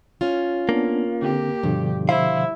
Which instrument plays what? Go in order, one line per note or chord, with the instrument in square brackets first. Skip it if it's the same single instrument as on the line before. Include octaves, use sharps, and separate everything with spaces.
[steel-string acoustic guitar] C#4 F4
[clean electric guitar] A#3 [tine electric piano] B3 D4
[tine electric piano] D3 C4 [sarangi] G4
[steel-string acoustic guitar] G2 [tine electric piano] B2 D3 F3
[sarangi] E4 [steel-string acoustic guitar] C5 [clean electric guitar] F5